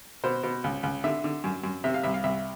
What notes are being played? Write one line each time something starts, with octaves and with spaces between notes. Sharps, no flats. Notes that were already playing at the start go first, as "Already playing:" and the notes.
B2 C5
B2
C#2
C#2
D3 E5
D3
F#2
F#2
C3 E5
F5
C2 E5
F5
C2 E5